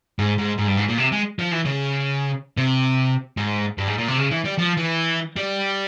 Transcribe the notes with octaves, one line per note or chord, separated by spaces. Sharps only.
G#2
G#2
G#2
G2
G#2
A#2
C3
G#3
F3
E3
C#3
C3
G#2
G2
G#2
A#2
C3
C#3
E3
G3
F3
E3
G3